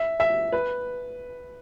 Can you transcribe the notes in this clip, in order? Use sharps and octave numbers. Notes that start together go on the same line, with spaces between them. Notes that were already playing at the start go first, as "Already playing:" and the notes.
Already playing: E5
E5
B4